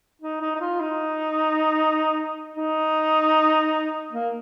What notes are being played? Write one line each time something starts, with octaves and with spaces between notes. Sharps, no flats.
D#4
D#4
D#4
F4
D#4
D#4
A#3